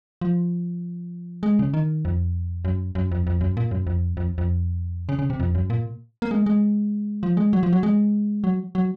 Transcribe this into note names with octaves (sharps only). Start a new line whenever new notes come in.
F3
G#3
C#3
D#3
F2
F#2
F#2
F2
F2
F#2
A#2
F#2
F2
F2
F2
C#3
C#3
C3
F2
F#2
A#2
A#3
G#3
G#3
F3
G#3
F#3
F3
F#3
G#3
F#3
F#3